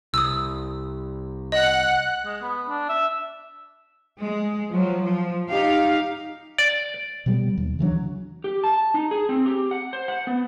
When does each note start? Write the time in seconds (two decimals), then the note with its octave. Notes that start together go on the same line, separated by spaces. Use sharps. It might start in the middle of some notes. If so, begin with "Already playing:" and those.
0.14 C2 D#6 E6
1.52 D#5 F#5 F#6
2.25 G#3
2.42 B3
2.68 D4
2.89 E5
4.20 G#3
4.71 F3 F#3
5.02 F3
5.49 D#4 G4 F5
6.58 D5
7.26 B2 F#3 G3 B3
7.57 D#2
7.79 C#3 E3 F#3 D4
8.44 G4
8.64 A5
8.94 D#4
9.11 G#4
9.29 C4
9.46 G4
9.71 F#5
9.93 C5
10.08 F#5
10.27 B3